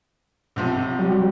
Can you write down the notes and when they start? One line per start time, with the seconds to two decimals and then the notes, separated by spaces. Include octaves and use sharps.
0.56 B1 C3 F3
0.99 F#3 G3